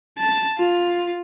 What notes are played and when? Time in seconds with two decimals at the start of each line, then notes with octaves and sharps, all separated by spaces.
0.18 A5
0.58 F4